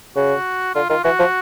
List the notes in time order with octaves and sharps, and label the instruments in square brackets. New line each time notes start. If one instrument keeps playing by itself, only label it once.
[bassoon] C#3 [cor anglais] F#4
[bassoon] D3 [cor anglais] F4
[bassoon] D#3 [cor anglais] F4
[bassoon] E3 [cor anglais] F#4
[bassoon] F3